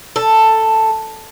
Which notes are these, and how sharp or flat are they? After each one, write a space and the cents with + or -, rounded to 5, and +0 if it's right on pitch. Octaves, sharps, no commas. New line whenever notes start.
A4 +5